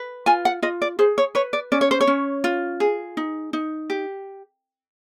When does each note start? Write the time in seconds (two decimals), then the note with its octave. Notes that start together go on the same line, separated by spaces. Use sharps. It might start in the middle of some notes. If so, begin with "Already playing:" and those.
Already playing: B4
0.26 F4 G#5
0.45 F#5
0.62 F4 D#5
0.82 D5
0.99 G#4 C5
1.18 C#5
1.35 B4 C#5
1.53 D5
1.72 C#4 D5
1.81 C#5
1.91 C5
2.01 C#5
2.07 C#4
2.44 F4
2.80 G#4
3.17 D#4
3.53 D#4
3.90 G4